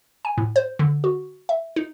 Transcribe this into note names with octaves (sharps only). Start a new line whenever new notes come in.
G#5
A2
C5
D3
F#4
E5
D#4